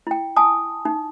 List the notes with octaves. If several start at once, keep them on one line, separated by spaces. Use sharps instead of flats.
E4 G5
G#5 A5 D#6
D#4